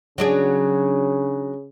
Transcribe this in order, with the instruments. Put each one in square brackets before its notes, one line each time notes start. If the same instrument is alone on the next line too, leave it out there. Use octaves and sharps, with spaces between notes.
[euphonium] C#3 [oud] F#3 D4 G#4